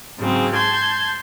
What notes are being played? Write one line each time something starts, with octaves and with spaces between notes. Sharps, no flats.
G#2 C#3 F#3 G#3 C4
A5 C6 G6 G#6